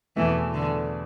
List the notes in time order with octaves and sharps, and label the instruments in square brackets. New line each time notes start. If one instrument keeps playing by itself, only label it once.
[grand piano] E2 B2 A3 E4 [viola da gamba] E3
[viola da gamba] D3